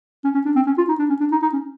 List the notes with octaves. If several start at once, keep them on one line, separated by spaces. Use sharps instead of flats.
C#4
C#4
D4
C4
C#4
F4
D#4
D4
C#4
D4
D#4
D#4
C#4